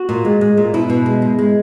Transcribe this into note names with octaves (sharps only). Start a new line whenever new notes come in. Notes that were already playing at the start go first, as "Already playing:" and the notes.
Already playing: F#4
A#2
G#3
G#3
A#2
B2 E4
B2
G#3
G#3
G#3